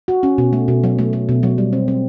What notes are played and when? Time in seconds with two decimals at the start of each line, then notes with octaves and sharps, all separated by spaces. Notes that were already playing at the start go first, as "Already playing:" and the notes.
0.08 F#4
0.23 C#4
0.38 B2
0.53 A3
0.68 B2
0.84 F#3
0.99 A3
1.13 A3
1.29 B2
1.43 F#3
1.58 G3
1.73 C4
1.88 C4